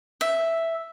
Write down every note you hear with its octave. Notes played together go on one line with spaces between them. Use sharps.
E5